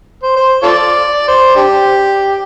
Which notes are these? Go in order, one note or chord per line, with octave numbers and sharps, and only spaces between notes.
C5
C5
F4 A4 D5
C5
D4 G4